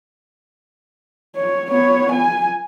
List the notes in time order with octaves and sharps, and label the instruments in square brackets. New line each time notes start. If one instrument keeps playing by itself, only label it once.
[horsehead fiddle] C#5
B3 C#5
G#5